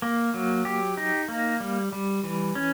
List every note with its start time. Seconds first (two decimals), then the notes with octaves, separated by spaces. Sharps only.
0.02 A#3
0.34 F#3
0.65 G4
0.97 D#4
1.28 A#3
1.60 G3
1.92 G3
2.24 E3
2.55 C#4